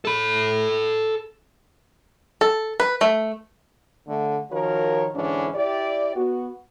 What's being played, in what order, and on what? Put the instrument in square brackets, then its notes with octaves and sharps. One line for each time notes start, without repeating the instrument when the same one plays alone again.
[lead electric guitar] A4 B5
[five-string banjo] A4
B4
A3
[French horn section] D3 A3
D#3 F3 F#4 A#4 C#5
G#2 D3 E3 C#4 D4
E4 G4 D5
B3 F#4